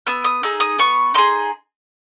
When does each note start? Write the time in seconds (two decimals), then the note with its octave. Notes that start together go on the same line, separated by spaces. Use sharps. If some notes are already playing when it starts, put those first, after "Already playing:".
0.07 B3 E6
0.24 D#6
0.43 D#4 G#4 E6
0.60 D#6
0.79 B3 C#6
1.14 D#4 G#4 C6